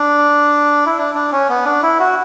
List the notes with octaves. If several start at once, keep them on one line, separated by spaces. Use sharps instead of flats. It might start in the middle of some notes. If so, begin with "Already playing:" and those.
Already playing: D4
E4
D4
D4
C#4
B3
D4
E4
F#4